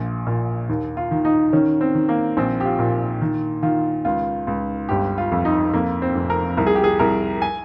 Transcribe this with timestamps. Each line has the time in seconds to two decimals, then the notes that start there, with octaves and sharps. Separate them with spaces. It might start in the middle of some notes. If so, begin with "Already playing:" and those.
Already playing: A#1 A#2
0.27 A#2
0.69 D#2
0.97 F4
1.11 D#3
1.25 D#4
1.53 D#3 C#4
1.81 C4
1.95 D#3
2.09 A#3
2.37 A#1 C4
2.61 G4
2.65 F4
2.79 A#2
3.21 D#3
3.62 D#3 F4
4.05 C#2 F4
4.47 C#2
4.89 G1 G4
5.18 F4
5.32 F2
5.45 D#4
5.73 F2 A#3
6.02 C4
6.15 F1
6.30 A#4
6.57 C2 A#4
6.67 G#4
6.75 G4
6.84 G#4
6.99 C2 A#4
7.42 G#5